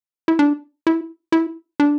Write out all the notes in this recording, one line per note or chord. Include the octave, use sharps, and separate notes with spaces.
E4
D4
E4
E4
D4